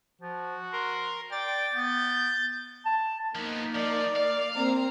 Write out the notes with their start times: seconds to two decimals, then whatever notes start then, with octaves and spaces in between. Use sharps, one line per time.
0.21 F3 F#4
0.72 A#4 C6
1.32 D5 G5 A6
1.74 B3 G6
2.85 A5
3.36 F3 A#3 B3 D#4
3.75 F3 D5
4.16 F5
4.56 A#3 C4 A#5